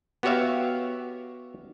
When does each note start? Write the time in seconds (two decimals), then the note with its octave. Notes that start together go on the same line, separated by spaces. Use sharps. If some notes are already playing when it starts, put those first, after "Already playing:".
0.23 B3 F#4 G4 C#5 E5 F5